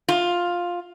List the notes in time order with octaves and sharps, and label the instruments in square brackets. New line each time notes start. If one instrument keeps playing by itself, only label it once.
[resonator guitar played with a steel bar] F4